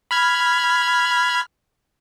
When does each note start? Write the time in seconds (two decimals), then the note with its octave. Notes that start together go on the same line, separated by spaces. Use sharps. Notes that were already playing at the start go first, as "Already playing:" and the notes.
0.11 B5 F6 G#6